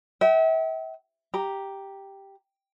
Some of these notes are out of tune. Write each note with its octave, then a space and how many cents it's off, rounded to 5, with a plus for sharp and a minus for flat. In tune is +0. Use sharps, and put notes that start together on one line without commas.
E5 -35 G5 -40
G4 +0 A#5 +0